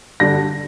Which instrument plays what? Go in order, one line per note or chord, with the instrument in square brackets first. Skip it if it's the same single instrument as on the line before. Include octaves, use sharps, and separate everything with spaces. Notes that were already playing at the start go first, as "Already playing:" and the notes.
[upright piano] G2 D3 G3 D4 A#6